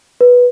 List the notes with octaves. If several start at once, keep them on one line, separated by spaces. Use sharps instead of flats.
B4